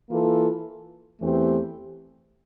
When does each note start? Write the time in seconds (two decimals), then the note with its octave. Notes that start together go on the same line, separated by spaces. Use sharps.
0.10 E3 A#3 F4 A4
1.20 E2 E3 A3 C4 G4